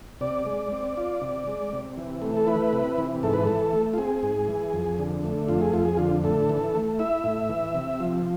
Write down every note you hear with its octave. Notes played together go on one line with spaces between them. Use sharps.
C3 D5
G#3
C4
F4
C3
G#3
C3
E3
A3
A4
E4 B4
C3
E3
G#2 A4
B4
E3 A4
A3
F4
C4 G#4
G#2
E3
F2
D3
A3
F2 F4
G#4
F2 F4
G#4
D3 F4
A2 A4
E3
A3
E4 E5
A2
E3
C3
F3